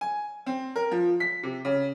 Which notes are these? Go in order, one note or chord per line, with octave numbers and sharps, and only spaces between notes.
G#5
C4
A#4
F3
B6
C3
C#3